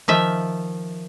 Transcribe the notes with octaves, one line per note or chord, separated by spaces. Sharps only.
D#3 F3 E5